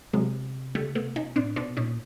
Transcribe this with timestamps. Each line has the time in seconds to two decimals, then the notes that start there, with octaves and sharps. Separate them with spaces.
0.13 C3 F#3 G#3
0.75 C#3 G3 A3
0.95 C3 A3 B3
1.16 B2 C#4 D#4
1.36 A2 C4 D4
1.56 B2 C4 D4
1.76 A#2 C#4 D#4